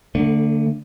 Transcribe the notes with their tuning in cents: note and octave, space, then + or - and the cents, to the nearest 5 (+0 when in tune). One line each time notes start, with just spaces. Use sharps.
D3 +0 A3 +35